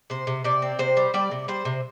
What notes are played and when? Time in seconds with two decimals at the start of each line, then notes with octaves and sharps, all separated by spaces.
0.10 C3 C5
0.27 C3
0.44 C3 D5
0.62 C4
0.79 C3 C5
0.97 G3
1.14 G3 D5
1.31 C3
1.48 G3 C5
1.65 C3